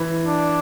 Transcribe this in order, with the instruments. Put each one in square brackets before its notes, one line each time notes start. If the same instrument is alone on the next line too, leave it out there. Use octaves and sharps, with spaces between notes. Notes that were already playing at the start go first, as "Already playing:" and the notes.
Already playing: [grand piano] E3
[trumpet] D4